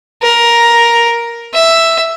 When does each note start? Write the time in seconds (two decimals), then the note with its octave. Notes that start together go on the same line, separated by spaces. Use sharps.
0.22 A#4
1.54 E5